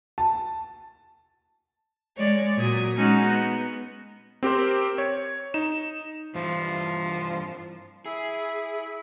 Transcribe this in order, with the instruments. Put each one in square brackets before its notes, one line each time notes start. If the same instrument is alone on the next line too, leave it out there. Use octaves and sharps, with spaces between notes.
[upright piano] A5
[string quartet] G#3 C#5 D5
A#2 F#3 D#6 G#6
G#3 C#4 D#4 F#4
B3
[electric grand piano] C4 G4 A#4 C5
C#5
D#4 E7
[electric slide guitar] G2 E3 [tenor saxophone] F3
[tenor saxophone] E4 [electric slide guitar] G#4